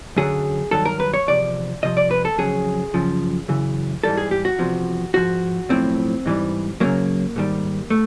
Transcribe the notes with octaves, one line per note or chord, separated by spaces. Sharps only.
F#2 D3 F#3 G#4
G2 D#3 F#3 A4
A#4
B4
C#5
E2 C3 F3 D5
C2 C3 F3 D#5
D5
B4
A4
F2 C#3 F#3 G#4
F#2 C#3 F3
F#2 C#3 E3
G#2 E3 G3 A4
G#4
G4
F#4
E2 C3 F3
G#2 F3 F#4
B1 A2 F3 C4
G#2 E3 G3
F#2 C#3 F#3 A#3
G#2 D#3 G3
A3